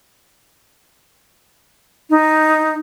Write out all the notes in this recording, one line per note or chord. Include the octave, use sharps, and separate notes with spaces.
D#4